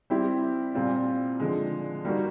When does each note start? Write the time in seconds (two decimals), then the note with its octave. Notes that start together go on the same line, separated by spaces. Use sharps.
0.10 G3 C4 E4 G4
0.74 A#2 G3 C4 F4
1.40 D3 F3 G#3
2.05 G3 A#3 D#4 F#4